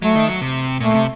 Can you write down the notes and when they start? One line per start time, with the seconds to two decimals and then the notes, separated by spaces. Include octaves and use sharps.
0.02 F#3 A3
0.16 D#3
0.28 F#3
0.41 C3
0.80 A#2 A3
0.94 C3